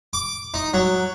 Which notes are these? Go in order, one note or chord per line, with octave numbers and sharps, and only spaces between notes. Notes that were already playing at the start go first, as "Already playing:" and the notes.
D6
D#4
F#3